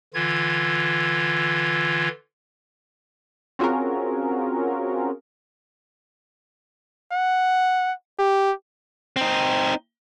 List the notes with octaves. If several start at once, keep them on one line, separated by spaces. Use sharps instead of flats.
D3 E3 F4 G#6
C4 C#4 F4 F#4 G#4 A#4
F#5
G4
C4 D#4